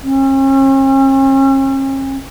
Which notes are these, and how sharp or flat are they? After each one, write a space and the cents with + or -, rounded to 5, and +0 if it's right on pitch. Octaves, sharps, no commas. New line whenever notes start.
C#4 -45